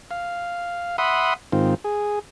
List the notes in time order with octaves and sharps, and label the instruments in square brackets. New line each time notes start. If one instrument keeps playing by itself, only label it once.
[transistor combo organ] F5
E5 F#5 B5 C6 D#6
G#2 D#3 C4 F4
G#4